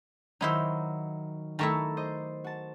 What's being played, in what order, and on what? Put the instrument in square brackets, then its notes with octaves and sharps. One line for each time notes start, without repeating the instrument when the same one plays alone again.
[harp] D#3 F#3 [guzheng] D#4 E4 C5
[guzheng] D#3 A3 E4 [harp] A5 A#5 C#6
[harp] C5 D#5
F#4 A5